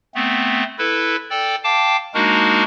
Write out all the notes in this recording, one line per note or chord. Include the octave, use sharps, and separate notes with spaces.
A3 B3 C4
E4 A4 B4
A4 D5 G5
F5 G5 A5 D6
G#3 A#3 D4 D#4 F#4 A#4